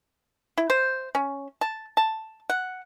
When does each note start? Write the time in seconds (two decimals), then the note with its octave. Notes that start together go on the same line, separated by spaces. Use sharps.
0.58 E4
0.70 C5
1.15 C#4
1.61 A5
1.97 A5
2.50 F#5